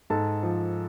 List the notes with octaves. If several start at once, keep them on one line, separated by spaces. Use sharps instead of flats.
G#2 A4 A5
F3